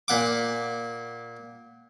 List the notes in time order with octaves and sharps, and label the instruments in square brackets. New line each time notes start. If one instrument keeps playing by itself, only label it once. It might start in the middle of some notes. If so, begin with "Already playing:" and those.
[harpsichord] A#2 F#5 D6